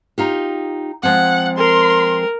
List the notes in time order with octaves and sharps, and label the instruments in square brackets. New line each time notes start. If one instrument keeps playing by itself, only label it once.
[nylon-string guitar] D#4 F4 G4
[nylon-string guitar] F3 G#3 C4 [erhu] F#5
[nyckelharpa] A#4 [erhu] C6